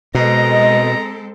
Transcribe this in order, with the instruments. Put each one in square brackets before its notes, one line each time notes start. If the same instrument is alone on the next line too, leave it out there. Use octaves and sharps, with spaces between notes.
[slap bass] B2 [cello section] G#3 C4 A4 [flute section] D#5 [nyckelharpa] A#5